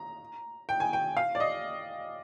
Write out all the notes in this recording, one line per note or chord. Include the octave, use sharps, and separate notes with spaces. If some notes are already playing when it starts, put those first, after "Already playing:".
Already playing: A#5
G5
G#5
G5
F5
D5
D#5